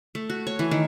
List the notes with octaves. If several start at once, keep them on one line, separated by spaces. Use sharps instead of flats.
A3
F#4
C#5
E3
D#3